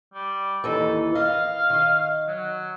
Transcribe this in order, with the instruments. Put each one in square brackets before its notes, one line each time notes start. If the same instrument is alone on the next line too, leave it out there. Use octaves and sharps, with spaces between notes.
[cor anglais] G3
[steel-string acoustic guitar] D#2 E3 D#4 [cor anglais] A4
[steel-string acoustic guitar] D#5 [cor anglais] F5
[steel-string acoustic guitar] D#3 D#5
[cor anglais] F#3